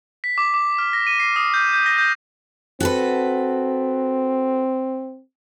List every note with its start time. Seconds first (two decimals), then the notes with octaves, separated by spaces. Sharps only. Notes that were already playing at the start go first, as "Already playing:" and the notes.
0.24 B6
0.38 D6
0.54 D6
0.78 F6
0.93 A#6
1.07 D#7
1.20 C7
1.36 D#6
1.54 G6
1.73 G6
1.86 A#6
1.98 G6
2.80 C4 F#4 A4 B4